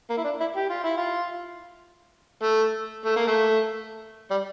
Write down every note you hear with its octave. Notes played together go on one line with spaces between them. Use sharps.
A#3
E4
D4
E4
G4
F4
E4
F4
A3
A3
A#3
A3
G3